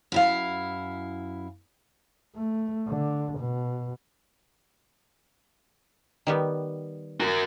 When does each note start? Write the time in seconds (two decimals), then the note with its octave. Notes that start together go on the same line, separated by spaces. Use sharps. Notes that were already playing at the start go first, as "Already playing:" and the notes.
0.12 F#2 E4 F5
2.36 A3
2.87 D3
3.39 B2
6.27 D#3 G3 B3
7.20 F#4 A#4